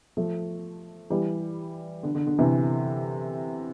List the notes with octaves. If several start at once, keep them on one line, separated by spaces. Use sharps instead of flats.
F3 A3
E3 G3
D3
D3
D3
C3 E3